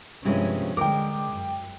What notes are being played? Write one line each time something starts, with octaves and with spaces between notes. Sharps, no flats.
G2 C3 F3 G#3 C#4
D3 G#3 A#4 G5 D6
F#2